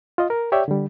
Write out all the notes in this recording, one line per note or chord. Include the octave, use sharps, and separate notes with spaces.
F4 D#5
A#4
G4 C#5 D5 E5 G5
D3 G3